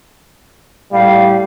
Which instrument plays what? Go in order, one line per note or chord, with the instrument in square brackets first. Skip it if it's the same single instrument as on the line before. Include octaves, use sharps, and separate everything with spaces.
[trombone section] A2 G3 [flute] F5